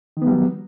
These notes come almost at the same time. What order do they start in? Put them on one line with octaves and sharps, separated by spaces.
D#3 B3 G3 F#3